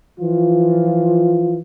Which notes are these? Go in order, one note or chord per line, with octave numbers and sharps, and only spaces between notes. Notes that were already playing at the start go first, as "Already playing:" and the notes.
E3 F3 F4